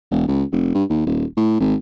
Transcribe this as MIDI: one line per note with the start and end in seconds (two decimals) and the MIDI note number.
0.11 0.27 28
0.28 0.43 37
0.52 0.70 29
0.74 0.84 43
0.90 1.03 39
1.06 1.25 27
1.37 1.58 45
1.60 1.75 32